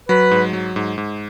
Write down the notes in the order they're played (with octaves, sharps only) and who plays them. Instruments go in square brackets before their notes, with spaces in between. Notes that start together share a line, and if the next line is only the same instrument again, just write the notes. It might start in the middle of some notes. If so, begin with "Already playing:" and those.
[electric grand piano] F#3 [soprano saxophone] B4
[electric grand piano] G#2
F#3
G#2
G#2